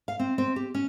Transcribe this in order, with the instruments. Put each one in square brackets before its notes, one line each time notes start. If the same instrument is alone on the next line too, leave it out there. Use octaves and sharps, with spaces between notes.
[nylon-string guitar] F5
C4
C4
G4
C#4